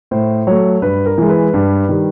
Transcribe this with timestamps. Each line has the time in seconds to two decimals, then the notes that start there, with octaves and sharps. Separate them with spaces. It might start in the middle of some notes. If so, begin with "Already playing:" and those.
0.11 A2 C5
0.47 F#3 A3 C#5
0.82 G2 B4
1.06 A#4
1.18 E3 G#3
1.29 B4
1.54 G2
1.89 D#3 G3